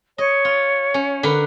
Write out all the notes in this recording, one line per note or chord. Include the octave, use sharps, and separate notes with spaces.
C#5 D#5
F4
C#4
D3 A#4 B4